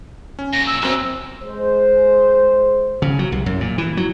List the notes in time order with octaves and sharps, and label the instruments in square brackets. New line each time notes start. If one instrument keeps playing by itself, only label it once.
[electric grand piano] C#4
[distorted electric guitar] A#2 F#3 [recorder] A#6
[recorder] E6
[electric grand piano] F#2 C4 [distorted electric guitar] E3 F#3
[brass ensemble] G#3 C5
[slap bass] C#3
F#3
C2
F#2
A#2
E3
F#3